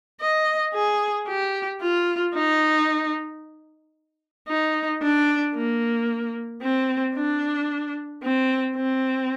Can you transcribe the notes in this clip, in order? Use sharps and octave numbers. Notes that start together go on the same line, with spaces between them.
D#5
G#4
G4
F4
D#4
D#4
D4
A#3
C4
D4
C4
C4